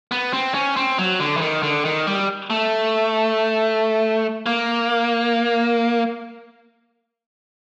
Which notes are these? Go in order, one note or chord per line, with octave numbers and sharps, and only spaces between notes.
B3
C4
C#4
C4
F#3
D3
E3
D#3
D3
D#3
G3
A3
A#3